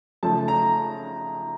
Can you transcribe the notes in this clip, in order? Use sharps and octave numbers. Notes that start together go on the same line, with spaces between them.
C#3 F3 A3 A5
A#5